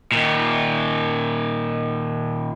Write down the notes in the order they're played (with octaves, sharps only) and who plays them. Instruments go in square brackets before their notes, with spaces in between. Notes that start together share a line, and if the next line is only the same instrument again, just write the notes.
[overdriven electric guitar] A#2 D#3